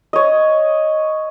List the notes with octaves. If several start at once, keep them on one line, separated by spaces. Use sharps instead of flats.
C#5 D#5